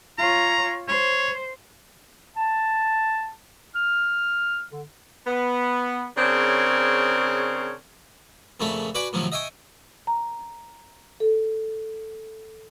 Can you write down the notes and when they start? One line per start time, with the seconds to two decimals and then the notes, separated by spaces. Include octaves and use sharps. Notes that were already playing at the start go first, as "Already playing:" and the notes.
0.18 F4 C#5 A#5
0.88 C5 C#5
2.37 A5
3.75 F6
4.71 D3
5.26 B3
6.17 C#3 C4 D4 G#4 A#4 C#5
8.60 F2 A#2 C#3 A3 C#4 B5
8.95 F#4 B4 D5 G#5 B5 D6
9.13 A2 C3 D#3 F3 F#3
9.32 D#5 E5 G5 G#5 C#6 D#6
10.07 A#5
11.20 A4